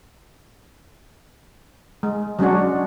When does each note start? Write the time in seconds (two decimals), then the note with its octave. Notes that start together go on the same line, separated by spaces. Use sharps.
2.03 G#3
2.39 F#3 G#3 C#4 D4 F#4